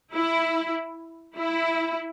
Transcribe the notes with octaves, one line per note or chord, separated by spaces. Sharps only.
E4
E4